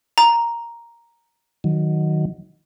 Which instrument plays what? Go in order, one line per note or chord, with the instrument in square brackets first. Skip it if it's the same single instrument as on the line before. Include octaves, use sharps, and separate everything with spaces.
[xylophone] A#5
[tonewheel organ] D#3 F#3